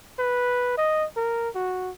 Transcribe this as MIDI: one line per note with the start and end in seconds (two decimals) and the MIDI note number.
0.19 0.77 71
0.78 1.05 75
1.17 1.49 70
1.55 1.91 66